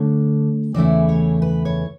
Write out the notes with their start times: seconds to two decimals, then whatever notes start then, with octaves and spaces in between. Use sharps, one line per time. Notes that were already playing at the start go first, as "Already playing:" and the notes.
Already playing: D3 A3 D4 C#5
0.74 E2 C#3 E3 A3 E4 D5
1.09 C#5
1.42 B4
1.65 C#5